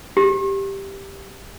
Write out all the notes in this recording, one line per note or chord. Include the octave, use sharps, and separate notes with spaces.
G4